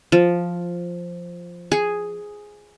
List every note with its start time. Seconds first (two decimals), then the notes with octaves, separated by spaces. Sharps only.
0.12 F3
1.72 G#4